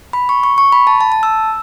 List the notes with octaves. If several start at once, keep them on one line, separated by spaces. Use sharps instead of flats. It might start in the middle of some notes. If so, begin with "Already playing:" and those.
B5
C#6
C#6
C#6
B5
A5
A5
A5
E6